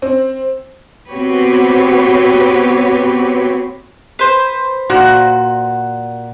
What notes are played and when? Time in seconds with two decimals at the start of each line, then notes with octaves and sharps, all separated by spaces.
0.02 C4
1.09 B3 C4 F#4 G4 B4 C#5
4.19 B4 C5
4.90 A#2 F#4